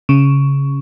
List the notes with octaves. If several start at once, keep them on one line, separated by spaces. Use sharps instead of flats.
C#3